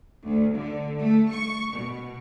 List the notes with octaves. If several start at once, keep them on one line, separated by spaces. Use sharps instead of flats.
D2
D3
A3
C#6
B2